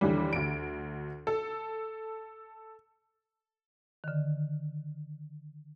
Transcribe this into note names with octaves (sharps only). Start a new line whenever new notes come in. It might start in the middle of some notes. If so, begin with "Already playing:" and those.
D#2 D3 E3 G3
D2 D7
A4
D3 D#3